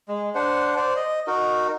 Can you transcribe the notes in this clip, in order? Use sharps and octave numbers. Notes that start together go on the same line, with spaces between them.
G#3
D4 C5 F#5
C5 D5
D#5
D#4 F#4 A#4